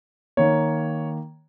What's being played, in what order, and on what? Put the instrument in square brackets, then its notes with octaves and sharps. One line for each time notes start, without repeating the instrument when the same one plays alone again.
[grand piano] D#3 A#3 C#5